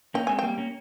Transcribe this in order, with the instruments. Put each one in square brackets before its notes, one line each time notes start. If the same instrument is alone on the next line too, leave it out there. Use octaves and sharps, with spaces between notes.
[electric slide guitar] A#3 C#4 [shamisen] G5
[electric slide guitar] G#3 C4 [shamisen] G#5
[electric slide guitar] G3 A#3 [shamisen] G5
[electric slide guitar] A#3 C#4